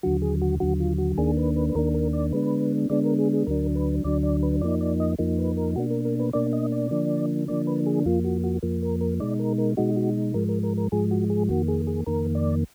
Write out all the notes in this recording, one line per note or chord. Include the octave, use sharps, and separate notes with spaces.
D#2 D3 F#3 F#4
G#4
F#4
D#2 D3 F#3 F#4
F4
F#4
D#2 D#3 A#3 D4 G#4
B4
B4
B4
D#2 D#3 A#3 D4 A#4
A#4
D5
D3 G#3 B3 D4 B4
D3 G#3 B3 D4 D5
A#4
G#4
G#4
D2 D3 F#3 D4 A#4
B4
D2 D3 F#3 D4 D5
D5
B4
F2 F3 A#3 D#4 D5
D5
D#5
F2 F3 A#3 D#4
B4
A#4
B2 A#3 D4 F#4
A#4
A#4
B4
B2 A#3 D4 D5
D#5
D5
D3 F3 A#3 D4
D3 F3 A#3 D4 D5
B4
G#4
F2 F3 A#3 F4
F#4
F#4
F2 F3 A#3
A#4
A#4
B2 G#3 D#4 D5
A#4
A#4
B2 G#3 D#4 F#4
F#4
G#2 F3 G#3 A#4
A#4
A#4
A#4
G#2 F3 G#3 G#4
F#4
G#4
F2 D#3 A#3 F#4
G#4
G#4
F2 D#3 A#3 A#4
D5